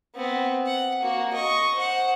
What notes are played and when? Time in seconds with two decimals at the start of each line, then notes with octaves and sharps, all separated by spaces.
0.16 B3 C4
0.66 F#5
1.02 A#3 F#4
1.33 D#5 C#6
1.74 C5 F#5